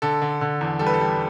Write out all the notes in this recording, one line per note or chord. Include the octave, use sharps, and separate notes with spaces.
D3 A4
D3
D3
E2
G3 A4
B4
A4
G3